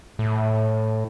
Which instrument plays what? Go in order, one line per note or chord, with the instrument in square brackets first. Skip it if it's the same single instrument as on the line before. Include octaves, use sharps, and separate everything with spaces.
[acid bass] A2